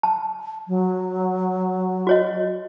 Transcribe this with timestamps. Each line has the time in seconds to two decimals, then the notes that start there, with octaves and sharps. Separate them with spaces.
0.03 A5
0.68 F#3
2.07 F#4 C#5 D#5